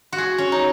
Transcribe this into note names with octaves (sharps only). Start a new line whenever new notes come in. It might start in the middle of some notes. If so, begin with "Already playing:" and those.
F#4
G#4
C#4
D#4